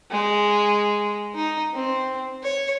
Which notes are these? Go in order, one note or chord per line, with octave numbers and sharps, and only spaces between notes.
G#3
D#4
C4
C#5